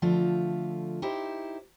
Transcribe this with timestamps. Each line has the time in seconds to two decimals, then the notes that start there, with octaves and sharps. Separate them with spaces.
0.02 D3 F3 A3 F4
1.02 D#4 E4 G4 C5